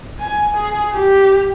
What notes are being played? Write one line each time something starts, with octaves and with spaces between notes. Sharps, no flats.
G#5
G#4
G4